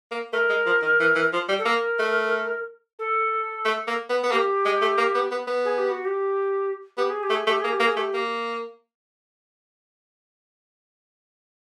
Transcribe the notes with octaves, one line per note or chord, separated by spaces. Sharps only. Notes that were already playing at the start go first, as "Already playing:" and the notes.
A#3
A3 A#4
G#3
F3
D#3
E3
E3
F3
G3
A4
A#3 A#4
A3
A4
A3
A#3
B3
B3
A#3 G4
G#3
A3
A#3
B3
B3
B3
G#4
G4
F#4
G4
B3 G4
G#4
G4
A3
G#4
A3 G4
A#3 G#4
G4
A#3
G#4
A3 G4
A#3